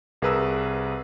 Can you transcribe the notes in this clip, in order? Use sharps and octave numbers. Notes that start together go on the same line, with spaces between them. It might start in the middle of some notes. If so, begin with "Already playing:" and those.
C2 G#4 A#4 B4 A#5 E6